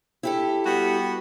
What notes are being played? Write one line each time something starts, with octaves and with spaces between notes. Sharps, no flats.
E4 G4 A4
G3 B3 F#4